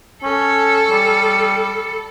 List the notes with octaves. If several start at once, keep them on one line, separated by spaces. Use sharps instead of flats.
C#4 A4
G3